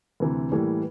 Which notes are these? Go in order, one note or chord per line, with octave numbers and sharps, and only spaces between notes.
D2 C3 E3
A2 E3 G3 A#3